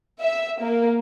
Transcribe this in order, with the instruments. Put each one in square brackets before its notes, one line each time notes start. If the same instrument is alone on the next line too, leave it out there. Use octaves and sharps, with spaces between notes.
[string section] E5
A#3